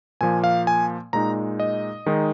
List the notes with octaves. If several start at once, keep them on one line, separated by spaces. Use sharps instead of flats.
A#2 F3 A#3 G#5
F5
G#5
A#2 G#3 D#4 A#5
D#5
D#3 G#3 D#4